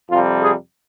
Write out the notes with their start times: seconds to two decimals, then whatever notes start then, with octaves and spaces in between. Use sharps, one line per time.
0.10 F2 C3 G3 F4
0.41 G#4